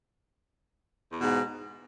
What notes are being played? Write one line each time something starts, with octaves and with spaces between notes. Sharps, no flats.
E2 G#2 B2